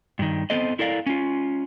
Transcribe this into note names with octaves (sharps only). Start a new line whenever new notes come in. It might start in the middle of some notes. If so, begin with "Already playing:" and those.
G2 D#3
B3 C4 A4 C5 D#5
E4 A4 A#4 D5 F5
C#4 F4